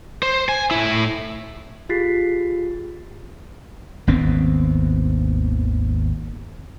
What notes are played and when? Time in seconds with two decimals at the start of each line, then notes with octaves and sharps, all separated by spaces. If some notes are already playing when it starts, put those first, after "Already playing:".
0.23 C5
0.49 G#5
0.71 A2 E4
1.89 F4 G4 G#4 A6 B6 C7
4.07 G#1 D#2 B3 C4